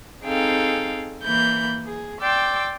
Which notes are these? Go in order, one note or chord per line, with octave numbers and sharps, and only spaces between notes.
C4 D#4 G#4 A4 F5 G5
E3 A#3 B5 G6
G#4
D5 G5 C6 D6 E6